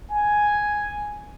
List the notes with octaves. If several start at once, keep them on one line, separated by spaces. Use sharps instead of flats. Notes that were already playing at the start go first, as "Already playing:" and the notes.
G#5